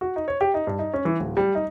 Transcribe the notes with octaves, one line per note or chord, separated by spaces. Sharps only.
F#4
D#4
C#5
G4
D#4
G2
D#4
C#4
E3
D1
G3
D#4